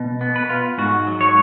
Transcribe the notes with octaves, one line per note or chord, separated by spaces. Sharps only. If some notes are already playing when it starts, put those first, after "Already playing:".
Already playing: B2
B3
B4
F4
G#2 F#4
F#3
C#5